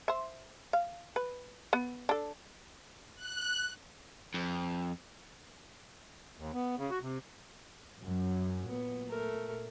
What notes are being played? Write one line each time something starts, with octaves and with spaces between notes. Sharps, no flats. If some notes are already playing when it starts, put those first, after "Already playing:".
C5 E5
F5
B4
B3
D4 A4
F#6
F2
D#2
B3
C#3
F#4
C3
F#2 F#3
A#2 B3
A3 A#4